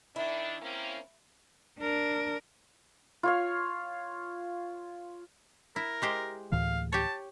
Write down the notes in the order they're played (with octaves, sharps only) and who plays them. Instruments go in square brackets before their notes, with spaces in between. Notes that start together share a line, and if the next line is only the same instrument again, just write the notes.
[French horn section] D#3 D4 [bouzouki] E4
[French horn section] A#3 C4 C#4
[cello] D4 A#4
[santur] F4 C#5 F5
[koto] E4 [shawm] A#4
[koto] G#3 G4 C5
[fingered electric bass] D2 A2 E3 [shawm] F5
[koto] G4 C#5 [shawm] A5